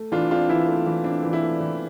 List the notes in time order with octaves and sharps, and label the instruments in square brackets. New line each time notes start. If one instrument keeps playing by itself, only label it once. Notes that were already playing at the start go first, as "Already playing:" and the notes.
Already playing: [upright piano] A3
E3 D4 F4
C4 D4 F4
E3 E4
A3
E3
C4 D4
E3
E4
A3
E3